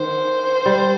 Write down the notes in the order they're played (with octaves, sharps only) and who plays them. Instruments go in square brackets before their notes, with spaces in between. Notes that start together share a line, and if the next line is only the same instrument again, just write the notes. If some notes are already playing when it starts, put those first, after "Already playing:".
Already playing: [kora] D#3 [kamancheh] C5
[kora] G3